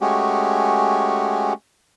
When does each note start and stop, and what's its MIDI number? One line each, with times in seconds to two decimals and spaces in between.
0.01 1.53 56
0.01 1.53 57
0.01 1.53 61
0.01 1.53 66
0.01 1.53 67